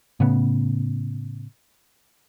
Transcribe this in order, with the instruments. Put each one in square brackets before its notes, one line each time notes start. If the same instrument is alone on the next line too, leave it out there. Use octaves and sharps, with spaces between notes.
[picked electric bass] A2 C#3 B3